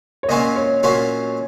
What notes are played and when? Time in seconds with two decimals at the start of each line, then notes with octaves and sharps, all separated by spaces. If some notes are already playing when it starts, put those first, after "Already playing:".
0.23 C#5
0.29 A#2 F#3 C#4 F4 D#5
0.56 C#5
0.83 A#2 F#3 C#4 F4